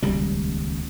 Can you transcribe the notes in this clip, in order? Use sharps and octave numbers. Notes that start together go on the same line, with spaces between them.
D#1 C#2 G3